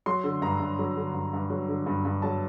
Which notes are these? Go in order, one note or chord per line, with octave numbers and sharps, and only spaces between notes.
F#3 C6
D3
G2 A#5
G2
F#3
D3
G2
G2
F#3
D3
G2
G2
F#3 A5